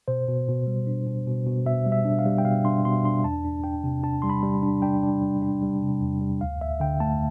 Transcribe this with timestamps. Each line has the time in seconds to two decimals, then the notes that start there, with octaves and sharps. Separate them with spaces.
0.08 B2 C5
0.28 B2
0.48 B2
0.67 G3
0.87 D4
1.06 B2
1.27 B2
1.46 B2
1.66 B2 E5
1.86 G3
1.92 E5
2.05 D4
2.19 F5
2.26 G3
2.38 G5
2.45 B2 F5
2.65 D4 C6
2.85 B2 C6
3.05 D4 C6
3.24 E2 A5
3.45 D4
3.64 D4 G5
3.84 C3
4.04 D4 A5
4.22 G3 C6
4.30 B5
4.43 G3
4.63 D4
4.82 D4 G5
5.03 D4
5.22 G3
5.42 D4
5.62 G3
5.82 C3
6.01 E2
6.21 G3
6.41 D2 F5
6.60 D2 E5
6.80 D3 G5
7.00 A3 A5